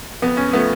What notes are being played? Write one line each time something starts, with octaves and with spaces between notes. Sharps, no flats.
F2 B3
C#4
F3 A3 B3